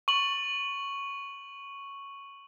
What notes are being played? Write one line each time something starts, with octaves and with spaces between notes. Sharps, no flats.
C#6 F#7